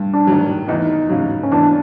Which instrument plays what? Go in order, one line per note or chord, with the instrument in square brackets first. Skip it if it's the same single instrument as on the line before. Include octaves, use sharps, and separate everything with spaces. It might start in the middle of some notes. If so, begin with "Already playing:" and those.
Already playing: [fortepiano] G2
[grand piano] D4
[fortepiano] D#3 F#3
[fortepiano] E2 [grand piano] D#4
[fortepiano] C#3 F#3
[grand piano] C#4
[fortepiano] E2 [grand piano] D4